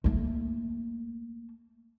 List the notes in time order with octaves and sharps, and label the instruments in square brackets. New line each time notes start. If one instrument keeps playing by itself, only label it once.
[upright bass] A3 A#3